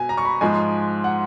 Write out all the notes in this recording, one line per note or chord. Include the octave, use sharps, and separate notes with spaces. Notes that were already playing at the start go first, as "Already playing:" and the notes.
Already playing: B2 G#5
A#5
C#6
B5
G#2 F3 G#3 G#5
F#5